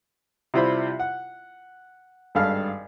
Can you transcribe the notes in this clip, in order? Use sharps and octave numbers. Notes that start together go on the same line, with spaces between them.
C3 G3 E4 F4 C5 B5
F#5
G#1 G2 A4 F5 F6